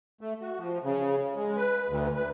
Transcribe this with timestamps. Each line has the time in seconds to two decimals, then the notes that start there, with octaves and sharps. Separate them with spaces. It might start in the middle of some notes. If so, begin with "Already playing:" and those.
0.21 A3
0.41 F#4
0.59 F3
0.83 C#3
1.36 G#3
1.57 B4
1.88 D2
2.16 B4